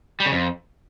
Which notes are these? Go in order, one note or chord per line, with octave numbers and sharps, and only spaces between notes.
G3
C#3
F2